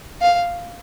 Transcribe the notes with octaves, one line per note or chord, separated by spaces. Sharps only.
F5